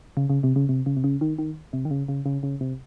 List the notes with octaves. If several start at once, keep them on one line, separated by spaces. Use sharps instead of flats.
C#3
C#3
C3
C#3
C3
C#3
C3
C#3
D#3
D#3
C3
D#3
C#3
C#3
C#3
C#3
C3